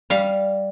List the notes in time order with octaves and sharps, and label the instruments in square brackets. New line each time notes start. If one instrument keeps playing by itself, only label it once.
[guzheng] G3 F5